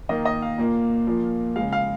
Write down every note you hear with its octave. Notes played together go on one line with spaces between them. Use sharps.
D#3 A#3 D#5
D#5
F5
A#2 A#3
A#2 F3 A#3
C#3 G#3 F5
F5